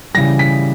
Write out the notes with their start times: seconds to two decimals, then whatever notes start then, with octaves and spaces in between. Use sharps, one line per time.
0.14 C#3 E3 G3 A#6
0.39 B6